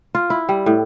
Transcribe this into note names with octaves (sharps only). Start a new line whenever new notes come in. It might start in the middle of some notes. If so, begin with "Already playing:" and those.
F4
E4
G3
A2